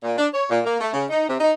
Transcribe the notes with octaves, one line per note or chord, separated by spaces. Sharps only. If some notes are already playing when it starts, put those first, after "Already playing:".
A#2
D4
C#5
A#2
A#3
A3
C#3
D#4
C3
D#4